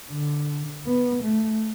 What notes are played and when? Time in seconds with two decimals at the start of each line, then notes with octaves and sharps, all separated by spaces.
0.11 D3
0.86 B3
1.23 A3